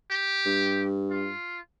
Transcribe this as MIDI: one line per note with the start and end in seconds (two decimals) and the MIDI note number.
0.11 0.86 67
0.46 1.32 43
1.10 1.59 65